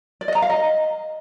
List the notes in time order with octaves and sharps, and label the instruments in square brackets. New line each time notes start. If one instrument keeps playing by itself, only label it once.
[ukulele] D5
D#5
A#5
F5
D#5